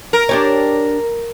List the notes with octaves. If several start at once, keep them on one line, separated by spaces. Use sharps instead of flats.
A#4
D4 G4 C#5